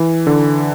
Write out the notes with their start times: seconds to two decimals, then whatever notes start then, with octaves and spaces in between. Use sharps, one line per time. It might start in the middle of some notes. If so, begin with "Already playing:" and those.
Already playing: E3
0.27 D3